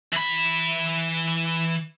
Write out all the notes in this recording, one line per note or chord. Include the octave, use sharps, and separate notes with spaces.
E3 B5